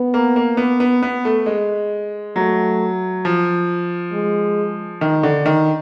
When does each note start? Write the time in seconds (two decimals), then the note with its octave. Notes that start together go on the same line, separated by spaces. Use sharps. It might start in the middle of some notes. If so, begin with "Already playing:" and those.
Already playing: B3
0.14 A#3
0.36 A#3
0.57 B3
0.80 B3
1.02 B3
1.25 A3
1.46 G#3
2.36 F#3 A3
3.25 F3
4.12 G#3
5.01 D#3
5.23 D3
5.46 D#3